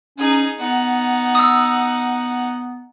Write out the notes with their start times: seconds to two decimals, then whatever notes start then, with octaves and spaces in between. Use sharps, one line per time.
0.18 C#4 D#4 G#4
0.59 B3 D#4 F#5
1.35 D#6 E6